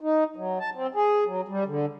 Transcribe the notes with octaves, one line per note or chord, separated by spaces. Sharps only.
D#4
F#3
A5
C4
G#4
F#3
G3
D3